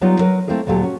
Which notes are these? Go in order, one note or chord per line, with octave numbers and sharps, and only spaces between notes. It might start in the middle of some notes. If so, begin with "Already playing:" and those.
F#3 G3 B3 D#4 F4
F#3 A#4 B4
A3 A#3 C4 E4 G#4 A#4
D2 A#2 F#3 F4 G4 A4
C#4 F#4